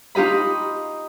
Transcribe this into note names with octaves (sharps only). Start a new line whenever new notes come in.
D#4 F4 G4 D#5 B5